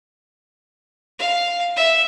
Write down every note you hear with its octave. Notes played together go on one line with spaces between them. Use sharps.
F5
E5